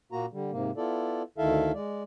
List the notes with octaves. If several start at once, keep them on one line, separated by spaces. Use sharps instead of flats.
A#2 A#3 F#4 A#5
D3 G3
G#2 C3 A#3
B3 E4 F4 A4 D5
D2 D#3 E4 A4 E5 F5
G#3 D5